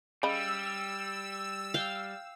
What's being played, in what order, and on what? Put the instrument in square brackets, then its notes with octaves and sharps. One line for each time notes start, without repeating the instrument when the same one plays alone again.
[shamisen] C#3 D#5 B5 [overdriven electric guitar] G3 [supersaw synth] E6
[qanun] F5 G5